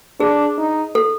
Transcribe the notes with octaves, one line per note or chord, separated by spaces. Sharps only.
D4 G#4
D#4
A4